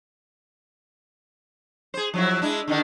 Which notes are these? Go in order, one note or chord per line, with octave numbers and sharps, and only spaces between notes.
G#4 C5
F3 F#3 E4
G#3 D4 E4
D3 D#3 D4